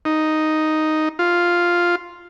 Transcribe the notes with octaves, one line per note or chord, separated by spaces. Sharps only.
D#4
F4